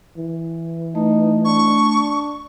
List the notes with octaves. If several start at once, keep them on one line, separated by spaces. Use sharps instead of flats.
E3
A3 D#4
D4 C#6